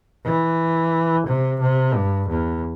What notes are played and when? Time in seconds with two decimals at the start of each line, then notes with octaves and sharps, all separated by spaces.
0.24 E3
1.27 C3
1.61 C3
1.95 G2
2.29 E2